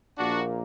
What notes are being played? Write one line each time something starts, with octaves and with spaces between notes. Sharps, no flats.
A#1 A#2 A#3 D4 F#4